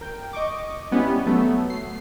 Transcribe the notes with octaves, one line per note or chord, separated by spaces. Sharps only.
A#4 G5
D#5 C#6 D6
G3 B3 C#4 E4 G4 D#5
F#3 A3 B3 A4
C7